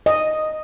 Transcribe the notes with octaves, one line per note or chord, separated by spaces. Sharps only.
D#5